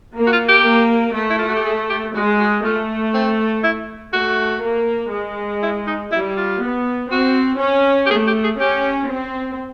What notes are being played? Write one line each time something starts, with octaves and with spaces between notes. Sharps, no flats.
A#3
F#4
F4
G4
A#3
A3
E4
F4
F#4
G4
G#4
G4
G#3 F#4
F#4
A3 F4
C4
E4
A3 F#4
A#3
G#3
E4
D#4
G3 E4
F4
B3
C4 F#4
C#4
G4
A3 G#4
G4
G#4
C#4 G4
C4